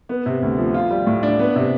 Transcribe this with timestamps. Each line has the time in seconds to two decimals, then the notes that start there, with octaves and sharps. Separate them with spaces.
0.09 B3
0.26 C3
0.42 D2
0.58 F3
0.74 F4
0.90 G3
1.07 A2
1.23 D4
1.39 B3
1.56 C3